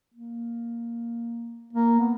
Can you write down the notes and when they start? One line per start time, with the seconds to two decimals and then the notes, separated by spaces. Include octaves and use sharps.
0.14 A#3
1.73 A#3
2.00 B3